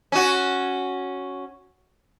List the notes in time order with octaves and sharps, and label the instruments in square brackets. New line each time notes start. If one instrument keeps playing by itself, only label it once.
[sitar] C#4 F#4